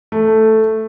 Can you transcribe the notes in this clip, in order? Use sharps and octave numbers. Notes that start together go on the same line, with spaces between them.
A3